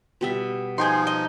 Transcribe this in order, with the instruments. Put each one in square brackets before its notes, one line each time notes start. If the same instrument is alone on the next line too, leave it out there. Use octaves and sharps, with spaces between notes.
[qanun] B2 G3 E5
[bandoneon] F3 D#4 [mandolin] G#4 G5 C6
[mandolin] D#5